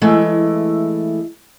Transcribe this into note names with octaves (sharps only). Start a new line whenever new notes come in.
E3 G#3 A3 E4